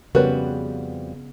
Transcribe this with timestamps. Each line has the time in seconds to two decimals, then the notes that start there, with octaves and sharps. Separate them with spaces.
0.15 F2 C#3 G3 B3 F#4 A#4 B4 C#5